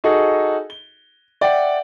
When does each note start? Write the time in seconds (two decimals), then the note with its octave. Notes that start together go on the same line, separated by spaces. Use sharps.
0.04 D#4 F#4 G#4 A4 D#5
0.70 G7
1.41 D5 E5 F#5 G5